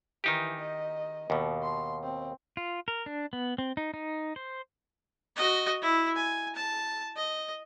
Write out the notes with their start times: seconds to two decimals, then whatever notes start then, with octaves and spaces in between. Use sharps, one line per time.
0.24 D#3 E3 D#4 G4
0.61 D#5
1.30 D#2 B2
1.62 C6
2.03 C4
2.57 F4
2.88 A#4
3.06 D4
3.33 B3
3.58 C4
3.77 D#4
3.94 D#4
4.36 C5
5.36 F#4 D#5
5.82 E4
6.16 G#5
6.56 A5
7.16 D#5